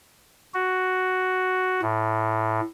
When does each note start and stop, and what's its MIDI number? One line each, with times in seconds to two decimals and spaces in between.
0.54 1.81 66
1.82 2.61 45